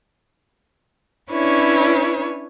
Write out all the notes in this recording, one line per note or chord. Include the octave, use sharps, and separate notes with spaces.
C#4 D4 E4 B4 C#5